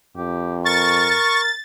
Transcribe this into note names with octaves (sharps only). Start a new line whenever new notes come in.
F2 G4
A#4 C#6 A6